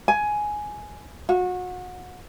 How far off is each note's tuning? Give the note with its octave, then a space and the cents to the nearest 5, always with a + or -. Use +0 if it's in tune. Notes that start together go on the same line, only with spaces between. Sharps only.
G#5 +10
F#4 -30